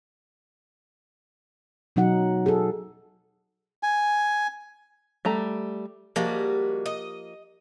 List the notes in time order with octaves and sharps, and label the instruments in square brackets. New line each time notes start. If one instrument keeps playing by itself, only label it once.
[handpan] B2 F#3 D#4 F#5
G#4 A4
[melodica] G#5
[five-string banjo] G3 A3 A#5
[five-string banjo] F3 A#3 [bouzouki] G3 G#3 F#4
[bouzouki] D#5